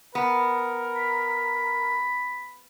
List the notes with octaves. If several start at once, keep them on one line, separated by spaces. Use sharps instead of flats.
B3 A#4
B5